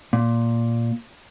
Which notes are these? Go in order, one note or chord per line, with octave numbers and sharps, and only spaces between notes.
A#2